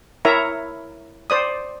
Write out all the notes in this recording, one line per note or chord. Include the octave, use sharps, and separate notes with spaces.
E4 A#4 C#5 E5 A#5
C5 D5 D#6